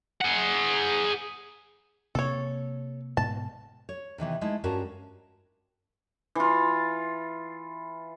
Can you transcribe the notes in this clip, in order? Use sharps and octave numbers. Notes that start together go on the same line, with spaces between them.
G#4 F#5
C3 A#3 A4 C#5
G#2 B2 A5
C#5
C3 D#3 E3 B3
G#3 A3 D#4 E4
G2 C#4 F4 F#4 A#4 A5
E3 F4